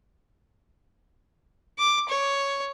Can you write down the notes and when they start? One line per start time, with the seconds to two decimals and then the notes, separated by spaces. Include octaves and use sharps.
1.79 D6
2.09 C#5